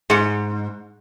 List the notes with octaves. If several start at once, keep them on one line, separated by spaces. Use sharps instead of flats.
G#2 G#4 C#7